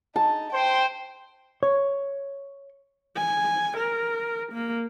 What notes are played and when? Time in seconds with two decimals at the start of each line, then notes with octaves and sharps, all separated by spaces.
0.16 D#4 A5
0.53 C5 G5
1.63 C#5
3.17 G#5
3.78 A#4
4.53 A#3